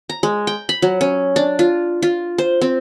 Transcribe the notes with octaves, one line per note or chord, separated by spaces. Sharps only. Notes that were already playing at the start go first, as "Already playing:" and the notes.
A#5
G#3
G5
B5
F#3
C#4
D4
F4
F4
C5
C4